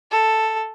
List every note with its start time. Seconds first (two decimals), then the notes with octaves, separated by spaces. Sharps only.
0.11 A4